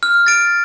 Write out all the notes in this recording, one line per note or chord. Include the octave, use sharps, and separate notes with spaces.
F6
A6 D7